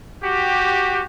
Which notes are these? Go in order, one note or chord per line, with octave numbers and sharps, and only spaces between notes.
F#4 G4